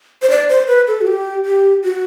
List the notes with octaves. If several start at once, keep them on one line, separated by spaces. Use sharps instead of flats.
C5
D5
C5
B4
A4
F#4
G4
G4
F#4